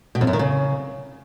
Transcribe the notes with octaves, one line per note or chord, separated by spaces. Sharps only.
B2
F2
F#2
D#3
C#3